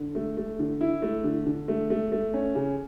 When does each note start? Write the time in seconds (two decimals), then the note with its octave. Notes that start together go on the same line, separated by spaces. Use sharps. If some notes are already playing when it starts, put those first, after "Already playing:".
Already playing: D3
0.15 A3
0.37 A3
0.59 D3
0.81 E4
1.02 A3
1.24 D3
1.46 D3
1.68 A3
1.90 A3
2.12 A3
2.34 C#4
2.55 C#3